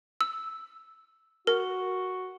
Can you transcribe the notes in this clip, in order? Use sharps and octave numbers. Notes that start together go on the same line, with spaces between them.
E6
F#4 A#4